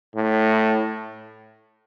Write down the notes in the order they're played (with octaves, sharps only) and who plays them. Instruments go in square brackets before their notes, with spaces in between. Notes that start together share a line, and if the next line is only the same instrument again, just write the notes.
[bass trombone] A2